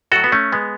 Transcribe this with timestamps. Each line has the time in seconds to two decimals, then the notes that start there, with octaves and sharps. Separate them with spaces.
0.11 A2 F#3 F#4 A4
0.24 B3
0.32 A3 C#4
0.52 G#3 B3